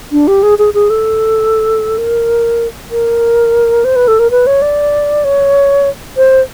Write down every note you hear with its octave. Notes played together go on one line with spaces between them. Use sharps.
D4
G4
G#4
G#4
G#4
A4
A#4
A#4
C5
B4
A4
A#4
B4
C#5
D5
C#5
C5